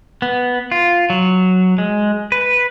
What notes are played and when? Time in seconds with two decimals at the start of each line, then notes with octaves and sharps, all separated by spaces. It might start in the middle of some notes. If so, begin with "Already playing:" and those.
0.22 B3
0.71 F4
1.10 F#3
1.78 G#3
2.32 B4